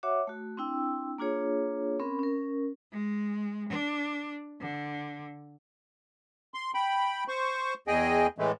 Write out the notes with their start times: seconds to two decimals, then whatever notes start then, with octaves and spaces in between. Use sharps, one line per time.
0.03 F#4 C#5 E5 F#5 D6
0.27 A3 F#4
0.57 C4 D4 E4 G5 E6
1.18 A#3 D4 F4 G#4 C#5
2.00 C4 C#4 A#4 B5
2.19 C#4 A#4
2.92 G#3
3.69 D4
4.61 D3
6.54 C6
6.74 G5 B5
7.28 C5 C#6
7.88 E2 G#4 D#5 G5 G#5
8.38 A2 E3 G#3 A3